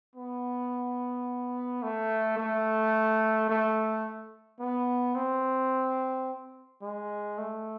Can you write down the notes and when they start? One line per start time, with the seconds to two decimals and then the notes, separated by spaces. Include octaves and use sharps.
0.15 B3
1.83 A3
2.38 A3
3.49 A3
4.60 B3
5.15 C4
6.82 G#3
7.38 A3